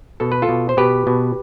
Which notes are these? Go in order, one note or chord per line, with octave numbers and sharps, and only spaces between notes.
B2 A4
B4
F4 A4
B2
C5
B2 G4 B4
B2